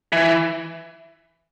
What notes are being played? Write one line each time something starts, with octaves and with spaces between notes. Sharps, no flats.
E3